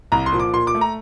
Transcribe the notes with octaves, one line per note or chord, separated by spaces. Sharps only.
C2 A#5
C6
A#2 F3
D6
A#2 C6
D6
A3
A#5